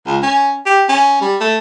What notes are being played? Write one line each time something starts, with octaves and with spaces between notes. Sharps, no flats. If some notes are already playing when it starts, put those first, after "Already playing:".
C#2
C#4
G4
C#4
G3
A3